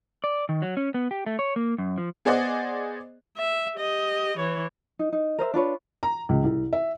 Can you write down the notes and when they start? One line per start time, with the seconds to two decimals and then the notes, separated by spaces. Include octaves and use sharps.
0.24 D5
0.49 D#3
0.62 F#3
0.77 C#4
0.94 B3
1.11 G4
1.26 A3
1.39 C#5
1.56 A#3
1.78 F#2
1.98 F3
2.25 B3 G#4 C5 D5 D#5 F#5
3.37 E5
3.76 G4 D#5
4.37 E3 C#5
4.99 D#4
5.12 D#4
5.39 A#4 C5 D#5 E5
5.54 D4 F4 B4 C#5
6.03 A#5
6.29 C#2
6.44 C2
6.73 E5